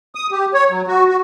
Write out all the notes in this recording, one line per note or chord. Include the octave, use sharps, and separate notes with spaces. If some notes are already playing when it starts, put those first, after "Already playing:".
D#6
G4
C#5
F#3
F#4
F#4